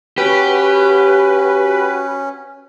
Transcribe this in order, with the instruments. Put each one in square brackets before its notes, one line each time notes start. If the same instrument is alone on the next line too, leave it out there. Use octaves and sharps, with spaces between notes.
[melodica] C#4 [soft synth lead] F#4 [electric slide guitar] G4 [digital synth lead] B4